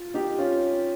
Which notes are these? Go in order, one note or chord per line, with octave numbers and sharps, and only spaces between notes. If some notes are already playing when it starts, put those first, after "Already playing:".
Already playing: F4
D#4 G4
C#4 F4